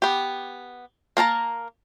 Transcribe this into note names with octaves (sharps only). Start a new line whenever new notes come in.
B3 G4
A#3 A#4 A5 A#5